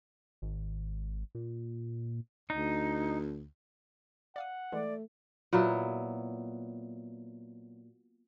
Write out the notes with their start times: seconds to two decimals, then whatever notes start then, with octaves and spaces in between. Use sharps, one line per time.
0.42 G#1
1.35 A#2
2.50 D2 D#4
4.36 D5 F5 F#5 D#6
4.72 E3 G#3 A3 D5
5.53 A#2 F#3 B3 E4